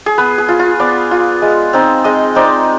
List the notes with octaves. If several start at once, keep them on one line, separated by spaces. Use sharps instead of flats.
G#4
B3 B4
G#4
F4
F4
B3 D5
F4
G#3
C4 D#4
G#3 D#5
C4 D#4 D5